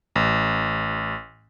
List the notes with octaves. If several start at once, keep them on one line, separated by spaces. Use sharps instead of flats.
A1